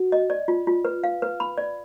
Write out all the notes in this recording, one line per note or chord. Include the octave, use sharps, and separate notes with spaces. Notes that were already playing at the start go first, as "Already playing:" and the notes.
Already playing: F#4
D#5
D5
F4
F4
B4
F5
B4
B5
D5